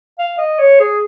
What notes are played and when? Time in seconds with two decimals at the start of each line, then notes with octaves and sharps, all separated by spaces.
0.19 F5
0.38 D#5
0.59 C#5
0.80 G#4